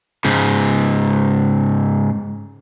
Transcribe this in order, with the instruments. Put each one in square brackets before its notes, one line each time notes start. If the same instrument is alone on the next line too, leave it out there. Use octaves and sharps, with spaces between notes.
[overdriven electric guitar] G#2 C#3